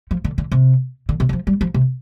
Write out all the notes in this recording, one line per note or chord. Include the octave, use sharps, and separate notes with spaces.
F3
D3
D3
C3
D3
C3
D3
F3
G3
F3
C3